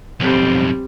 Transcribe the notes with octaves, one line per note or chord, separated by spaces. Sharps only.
B1 F2 G3 C4